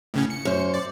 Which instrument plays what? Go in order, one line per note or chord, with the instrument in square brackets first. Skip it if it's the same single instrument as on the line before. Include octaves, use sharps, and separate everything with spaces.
[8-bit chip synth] A2 C#3 C#4
C#7
[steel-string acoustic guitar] F#2 C5
[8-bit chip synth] D5